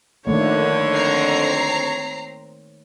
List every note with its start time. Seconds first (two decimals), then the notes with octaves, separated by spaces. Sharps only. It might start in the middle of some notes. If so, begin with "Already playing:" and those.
0.27 F2 D3 D#3 A3 A#3 C#5
0.94 C4 A#5 C7